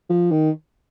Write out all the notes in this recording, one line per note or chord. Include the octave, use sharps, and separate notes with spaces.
F3
D#3